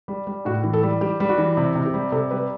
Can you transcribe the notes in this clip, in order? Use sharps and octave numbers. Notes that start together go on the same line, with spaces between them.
G3
G3
A2 F#4
E3
A4
G3
G3 G4
G3
F#4
E3
C3
C3
G4
G3
C3 A4
G3 B4